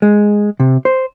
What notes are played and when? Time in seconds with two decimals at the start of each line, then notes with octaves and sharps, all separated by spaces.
0.02 G#3
0.60 C3
0.85 C5